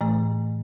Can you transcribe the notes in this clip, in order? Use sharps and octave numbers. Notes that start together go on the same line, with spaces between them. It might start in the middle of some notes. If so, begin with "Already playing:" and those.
A2 E3 A3